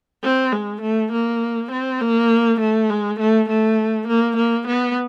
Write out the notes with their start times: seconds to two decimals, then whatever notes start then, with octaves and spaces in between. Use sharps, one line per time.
0.23 C4
0.52 G#3
0.82 A3
1.12 A#3
1.72 C4
2.01 A#3
2.60 A3
2.90 G#3
3.20 A3
3.49 A3
4.07 A#3
4.37 A#3
4.67 B3